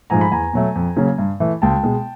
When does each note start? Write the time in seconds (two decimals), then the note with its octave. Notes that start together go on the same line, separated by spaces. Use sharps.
0.10 G#2 F3 A3 G#5 A#5
0.21 B5
0.32 E2 G#5 A#5
0.53 B2 F#3 A3
0.76 F2
0.97 C#3 F#3 A#3
1.18 G2
1.40 E3 A3
1.62 C#2 G5 A5
1.83 B2 G#3